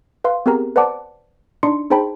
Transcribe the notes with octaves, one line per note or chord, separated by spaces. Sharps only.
B4 F5 C6
B3 C4 G4 G#4 A#4 A#5
B4 C5 D5 F#5 A5 D6
D4 D#4 D5 C6 C#7
D#4 G#4 C5 G5 A5 B5